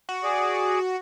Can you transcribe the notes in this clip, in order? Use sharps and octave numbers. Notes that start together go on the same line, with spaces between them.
F#4
G#4 D5